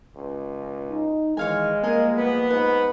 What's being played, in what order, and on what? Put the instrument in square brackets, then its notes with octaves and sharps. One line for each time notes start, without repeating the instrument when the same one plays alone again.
[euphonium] C#2
[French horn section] D#4
[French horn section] D#3 E3 [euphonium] G#3 [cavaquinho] C#5 F5 G#5
[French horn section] F3 G3 A#3 [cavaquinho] G#4 A#4 D#5
[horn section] B3
[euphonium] G#2 [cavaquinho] B4